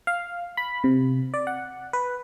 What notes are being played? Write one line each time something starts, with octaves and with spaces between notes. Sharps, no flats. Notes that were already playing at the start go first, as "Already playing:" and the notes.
F5
B5
C3
D5
F#5
B4